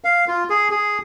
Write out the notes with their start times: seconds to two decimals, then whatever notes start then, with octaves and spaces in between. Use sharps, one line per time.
0.04 F5
0.28 F4
0.50 G#4
0.71 G#4